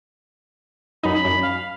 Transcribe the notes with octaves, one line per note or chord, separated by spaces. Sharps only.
F#2 D#4 B5
F#2
F5